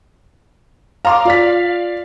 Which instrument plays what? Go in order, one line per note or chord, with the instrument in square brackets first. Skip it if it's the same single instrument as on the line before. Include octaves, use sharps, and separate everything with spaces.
[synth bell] F5 [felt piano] A#5 C6 D6
[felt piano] F4 D5 B6